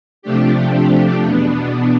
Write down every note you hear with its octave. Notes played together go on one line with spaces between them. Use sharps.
C3 F3 A3 D4 G4
E2 B2 B3 D4